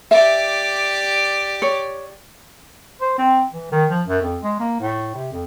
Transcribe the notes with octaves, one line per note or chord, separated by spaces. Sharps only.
G4 D5 E5
C#5
C5
C4
E3
D#3
F3
F#2
F2
G#3
A#3
A2
C3
F2